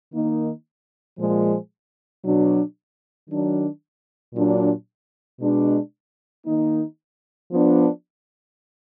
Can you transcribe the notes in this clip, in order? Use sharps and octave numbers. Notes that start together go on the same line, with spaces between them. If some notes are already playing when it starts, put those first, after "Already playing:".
D#3 A#3 D#4
A#2 F3 G#3
B2 F#3 D4
D#3 F#3 D4
A#2 F#3 D4
B2 G#3 D4
D#3 A#3 D#4
F3 B3 D4